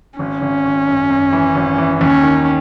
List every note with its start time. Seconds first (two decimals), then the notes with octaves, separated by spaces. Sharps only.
0.19 G#1 C#4
0.42 G#1
0.65 G#1
0.87 F#2
1.10 F#2
1.33 E3
1.55 G#1
1.78 E3
2.00 D#2 C#4
2.23 D#3